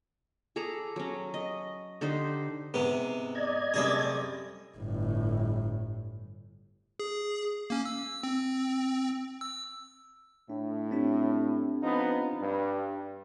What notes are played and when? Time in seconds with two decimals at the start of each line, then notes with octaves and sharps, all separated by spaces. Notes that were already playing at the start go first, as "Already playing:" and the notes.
0.56 G#4 A4 D5 A#5
0.96 F#3 C#4
1.34 D#5
2.01 D3 D#4 G4 C5
2.74 G#2 C3 B3
3.35 D5 D#5 G#6
3.74 F#2 C3 G3 A3 G#4
4.77 G1 A2
6.99 G#4
7.70 A#3 C#4
7.85 E6
8.23 C4
9.41 E6
10.50 A2 D4
10.91 C4 D4 G4
11.83 F3 B3 D#4
12.42 G2